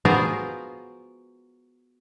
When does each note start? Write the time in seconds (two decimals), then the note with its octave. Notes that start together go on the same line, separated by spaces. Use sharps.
0.05 B3 F4 F#4 G#4 A#4 C5